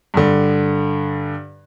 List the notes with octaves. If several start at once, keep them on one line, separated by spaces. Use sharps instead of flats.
G2 D3